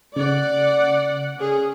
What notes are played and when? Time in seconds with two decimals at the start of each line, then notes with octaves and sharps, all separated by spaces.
0.16 C#3 D5 F#5
1.38 C#4 G#4